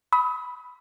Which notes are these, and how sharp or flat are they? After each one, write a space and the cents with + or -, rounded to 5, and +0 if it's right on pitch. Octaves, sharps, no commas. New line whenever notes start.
B5 +0 D#6 +40